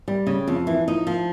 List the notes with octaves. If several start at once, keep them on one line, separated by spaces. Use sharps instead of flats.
G3
C#3
F2
E3
F3 D#4
F3